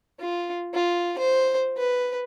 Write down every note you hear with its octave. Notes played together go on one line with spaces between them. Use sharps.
F4
F4
C5
B4